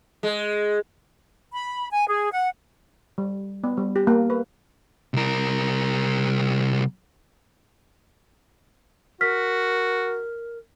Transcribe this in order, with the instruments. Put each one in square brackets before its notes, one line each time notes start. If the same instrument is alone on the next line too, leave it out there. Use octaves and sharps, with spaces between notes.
[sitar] G#3
[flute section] B5
G#5
G#4
F#5
[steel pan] G3
B3
G3
G4
A#3
B4
[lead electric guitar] C2 A#4
[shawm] F#4 [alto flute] A#4 [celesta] F6 B6